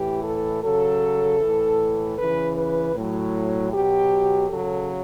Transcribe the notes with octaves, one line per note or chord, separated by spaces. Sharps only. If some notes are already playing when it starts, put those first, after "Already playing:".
Already playing: A2 E3 G4
A4
C#3 F#3 A4
A2 E3
C#3 E3 B4
B4
A2 F#3
B2 F#3 G4
C#3 F#3 A4